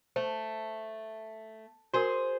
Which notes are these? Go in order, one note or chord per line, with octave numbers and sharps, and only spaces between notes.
A3 C5
F#4 G#4 A#4 C5